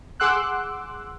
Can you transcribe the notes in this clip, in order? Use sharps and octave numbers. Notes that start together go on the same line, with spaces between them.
G#4 F#5 C6 D6 E6 F#6